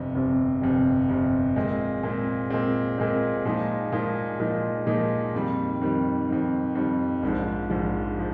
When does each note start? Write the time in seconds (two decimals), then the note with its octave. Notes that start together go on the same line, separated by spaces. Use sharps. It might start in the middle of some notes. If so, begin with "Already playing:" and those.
Already playing: G1 F2 C3
0.15 G1 F2 C3
0.62 G1 F2 C3
1.09 G1 F2 C3
1.56 A#2 G#3 C4
2.03 A#2 G#3 C4
2.50 A#2 G#3 C4
2.98 A#2 G#3 C4
3.45 A#2 F3 G#3 D#4
3.92 A#2 F3 G#3 D#4
4.40 A#2 F3 G#3 D#4
4.87 A#2 F3 G#3 D#4
5.34 F2 D#3 G3
5.81 F2 D#3 G3
6.29 F2 D#3 G3
6.75 F2 D#3 G3
7.23 A#1 G#2 F3
7.70 A#1 G#2 F3
8.19 F3